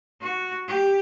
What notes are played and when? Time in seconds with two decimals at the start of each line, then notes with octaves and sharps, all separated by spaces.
0.21 F#4
0.68 G4